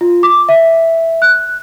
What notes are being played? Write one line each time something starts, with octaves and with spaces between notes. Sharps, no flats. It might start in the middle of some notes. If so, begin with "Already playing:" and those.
F4
D6
E5
F#6